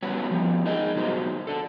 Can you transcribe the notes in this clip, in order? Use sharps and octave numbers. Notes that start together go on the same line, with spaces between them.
G3 B3 C#4 F#4 B4 C#5
F3 G3 B3
D#4 G#4 A#4 D#5
B2 D#3 F#3 G3 C5
D4 A4